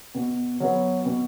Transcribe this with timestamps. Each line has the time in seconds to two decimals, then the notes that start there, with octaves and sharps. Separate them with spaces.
0.15 B2
0.60 F#3 B3
1.05 B2